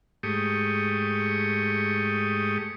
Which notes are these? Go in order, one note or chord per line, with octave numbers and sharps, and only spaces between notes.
G#2 A3 G4 C#6 D#6